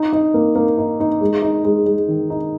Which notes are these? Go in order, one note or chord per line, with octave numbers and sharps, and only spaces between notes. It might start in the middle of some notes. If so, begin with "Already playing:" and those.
Already playing: D#4
D#4
A#3
A#3
D#4
D#4
G#3
D#4
G#3
G#3
D#3
D#4